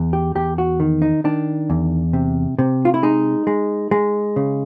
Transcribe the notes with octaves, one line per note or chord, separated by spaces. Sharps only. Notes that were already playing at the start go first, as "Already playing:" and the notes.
Already playing: E2
G4
E2 G4
F#4
D#3
D#4
D#3 D4
E2
C3
C3
F4
E4
G#3 D#4
G#3
G#3
C#3